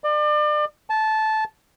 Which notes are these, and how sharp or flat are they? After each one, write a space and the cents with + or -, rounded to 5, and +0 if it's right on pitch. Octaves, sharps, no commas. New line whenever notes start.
D5 +35
A5 -15